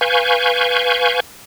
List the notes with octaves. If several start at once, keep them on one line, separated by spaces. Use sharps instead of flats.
B4 F5 G#5 C#6 G6